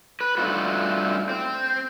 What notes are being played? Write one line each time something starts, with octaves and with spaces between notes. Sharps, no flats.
B4
G2 A3 C4 D#4 F4 F#4
C4